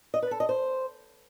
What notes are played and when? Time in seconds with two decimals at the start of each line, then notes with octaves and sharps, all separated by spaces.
0.14 D#5
0.22 B4
0.31 A4
0.40 D#5
0.49 C5